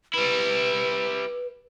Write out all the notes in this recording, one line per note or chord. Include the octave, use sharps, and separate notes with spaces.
G3 E4 B4